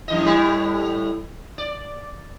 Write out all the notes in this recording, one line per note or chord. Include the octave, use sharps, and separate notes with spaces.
F#2 E3 D#5
A2 G3 E4
D5